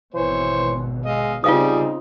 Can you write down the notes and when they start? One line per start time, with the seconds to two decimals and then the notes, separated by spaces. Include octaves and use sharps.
0.14 G#1 B2 E3 C5 C#5
1.06 G#3 D#5 F5
1.44 C#3 G3 C4 D#4 F4 G#4 F5 D#6